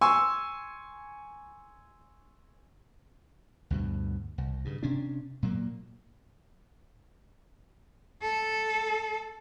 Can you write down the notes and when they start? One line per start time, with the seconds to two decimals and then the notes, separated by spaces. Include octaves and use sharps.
0.01 G#5 C6 C#6 E6
3.70 D2 G2 B2
4.38 C2
4.65 G2 C#3
4.83 C3 C#4 D4
5.43 A#2 F#3 A#3
8.22 A4